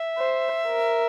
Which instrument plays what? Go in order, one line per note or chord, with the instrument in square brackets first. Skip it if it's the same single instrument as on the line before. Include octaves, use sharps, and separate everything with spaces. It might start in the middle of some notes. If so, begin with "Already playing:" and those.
Already playing: [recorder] E5
[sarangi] C5
A#4